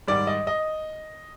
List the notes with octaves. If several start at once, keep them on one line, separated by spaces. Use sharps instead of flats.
G#2 D#3 G3 D5
D#5
D#5